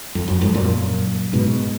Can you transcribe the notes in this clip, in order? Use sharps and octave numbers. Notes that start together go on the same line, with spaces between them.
F2
F#2
F2 G#2
F#2 A#2
G#2 B2